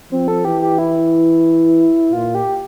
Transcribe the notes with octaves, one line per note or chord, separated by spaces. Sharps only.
F3 C4
A4
E3 G4
G4
E4
A#2 F4
G4